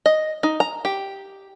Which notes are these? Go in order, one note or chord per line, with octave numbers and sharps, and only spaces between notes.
D#5
D#4
A#5
G4